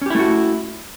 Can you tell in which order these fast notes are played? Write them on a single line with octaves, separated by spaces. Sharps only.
C#4 G4 E4 A3 F#4